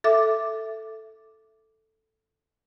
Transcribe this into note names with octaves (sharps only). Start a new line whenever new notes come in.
A4 E5 D6